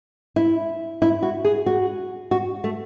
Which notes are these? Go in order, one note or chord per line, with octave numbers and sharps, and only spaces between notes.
E4
E4
F#4
G#4
F#4
F#4
A3